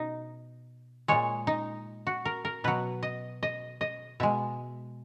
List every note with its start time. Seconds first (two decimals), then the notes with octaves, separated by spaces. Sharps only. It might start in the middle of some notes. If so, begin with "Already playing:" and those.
Already playing: B2 D#4
1.08 A#2 G#3 C#5
1.47 D#4
2.07 F#4
2.25 A#4
2.45 A#4
2.64 B2 F#3 B4
3.03 D#5
3.43 D#5
3.81 D#5
4.20 B2 G#3 E5